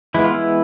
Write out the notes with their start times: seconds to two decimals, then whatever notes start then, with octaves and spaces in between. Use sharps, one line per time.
0.14 E3 G#3 B3 E4
0.24 F4
0.34 E4